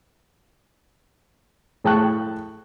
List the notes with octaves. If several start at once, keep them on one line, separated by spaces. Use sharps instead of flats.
A2 G#4 G5 A5 C#6 F#6